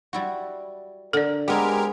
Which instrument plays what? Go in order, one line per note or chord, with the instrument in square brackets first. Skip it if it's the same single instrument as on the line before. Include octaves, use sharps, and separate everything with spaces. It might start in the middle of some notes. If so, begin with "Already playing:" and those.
[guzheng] G3 E4 F#4
[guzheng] D3 [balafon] A4 D5 [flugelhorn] A#4
[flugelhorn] G#3 [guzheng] B3 C4 G#4 [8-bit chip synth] G4 A#4